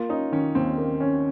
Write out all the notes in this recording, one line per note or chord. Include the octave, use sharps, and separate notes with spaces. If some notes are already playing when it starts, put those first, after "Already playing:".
Already playing: A#3 F4
C#4 D#4
D#3 C#4
D#2 C4
A#3
C#4